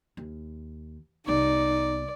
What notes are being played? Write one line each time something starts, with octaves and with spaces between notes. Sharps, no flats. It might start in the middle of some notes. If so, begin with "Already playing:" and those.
D#2
C2 B3 D#4 D5